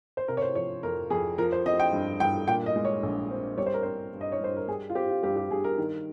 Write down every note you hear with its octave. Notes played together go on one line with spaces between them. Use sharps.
C5
C3 A#4
C#5
C5
F3 C#5
F2 A#4
F2 G#4
F3 A#4
C5
C4 D#5
G5
G2
G2 G5
A#2 G5
D#5
G#3
C#5
A#1
C4
G3 C#5
C5
A#4
C4 C5
G2
D#5
C#5
G2 C5
A#4
G3 G#4
F4
C4 G4
F4
G2 G4
G4
G2 G#4
A#4
D#3